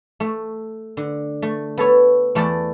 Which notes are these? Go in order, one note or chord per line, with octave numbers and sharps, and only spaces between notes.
A3
D3
A3
B3 A4 C#5
E2 A3 A4 D5 A5